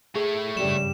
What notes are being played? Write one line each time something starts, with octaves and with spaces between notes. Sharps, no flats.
A3 G#4 C#5
G2 C#3 G3 E7